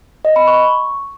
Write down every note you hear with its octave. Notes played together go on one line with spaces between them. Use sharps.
D#5
B5
C#6